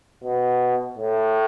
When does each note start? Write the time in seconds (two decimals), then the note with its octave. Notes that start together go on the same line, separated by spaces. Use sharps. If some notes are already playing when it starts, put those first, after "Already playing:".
0.24 B2
0.98 A2